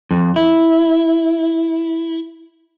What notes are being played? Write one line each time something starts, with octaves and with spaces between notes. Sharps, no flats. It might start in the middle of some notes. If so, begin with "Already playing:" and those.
F2
E4